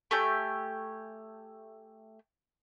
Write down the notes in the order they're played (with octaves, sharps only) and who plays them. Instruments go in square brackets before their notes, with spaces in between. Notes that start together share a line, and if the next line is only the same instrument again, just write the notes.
[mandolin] A3 G4 G#5 G6